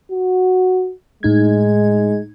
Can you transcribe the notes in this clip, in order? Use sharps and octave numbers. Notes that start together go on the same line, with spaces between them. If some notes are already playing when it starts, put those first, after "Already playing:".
F#4
A2 G#3 D#4 G#6